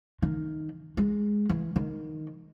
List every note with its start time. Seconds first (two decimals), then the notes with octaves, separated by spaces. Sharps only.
0.22 D#3
0.97 G#3
1.49 E3
1.76 D#3